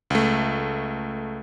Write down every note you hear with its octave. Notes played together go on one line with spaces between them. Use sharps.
C#2 A3